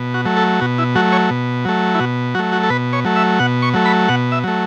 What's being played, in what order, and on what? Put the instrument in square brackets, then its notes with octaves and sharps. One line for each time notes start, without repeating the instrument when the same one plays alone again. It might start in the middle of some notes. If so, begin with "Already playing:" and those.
Already playing: [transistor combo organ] B2
F#4
F#3 A3
A4
B2 F#4
E4
F#3 A3 F#4
C#5
B2
F#3 A3
E4
B2 F#4
F#3 F#4
A3
F#4
A4
B2 B4
C#5
F#3 A3
E5
B2 F#5
C#6
F#3 A3
B5
B2 F#5
E5
F#3 A3